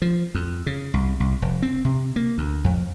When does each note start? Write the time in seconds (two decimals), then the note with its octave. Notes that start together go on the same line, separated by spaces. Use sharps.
0.02 F3
0.35 F2
0.66 C#3
0.94 C2
1.20 C2
1.42 F1
1.62 C4
1.85 C3
2.16 A#3
2.38 D2
2.64 F2